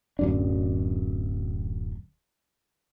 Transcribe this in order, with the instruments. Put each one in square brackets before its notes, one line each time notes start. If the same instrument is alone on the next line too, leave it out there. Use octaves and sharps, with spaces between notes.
[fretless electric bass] D1 F#2 D4